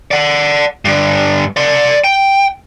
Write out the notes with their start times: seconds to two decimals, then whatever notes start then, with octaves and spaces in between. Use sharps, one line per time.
0.11 D5 F#5
0.85 G2 D3
1.57 D5 C6
2.04 G5